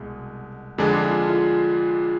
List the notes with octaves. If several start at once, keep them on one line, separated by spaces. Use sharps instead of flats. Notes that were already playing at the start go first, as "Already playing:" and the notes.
Already playing: C2 B2 G#3
F2 D3 G#3 D4 G#4
F4
F4